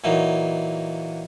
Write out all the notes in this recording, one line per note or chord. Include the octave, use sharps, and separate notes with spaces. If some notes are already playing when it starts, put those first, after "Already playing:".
A#2 E3 F#3 D#4